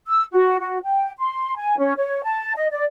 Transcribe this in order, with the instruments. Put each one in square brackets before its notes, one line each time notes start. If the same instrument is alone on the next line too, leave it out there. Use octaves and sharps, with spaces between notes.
[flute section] E6
F#4
F#4
G5
C6
G#5
C#4
C#5
A5
D#5
D5